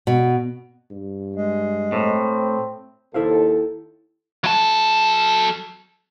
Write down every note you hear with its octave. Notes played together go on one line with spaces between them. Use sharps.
B2
G2
G#3
A2 C4
D#2 E4 A4 C5 F5
F#3 A4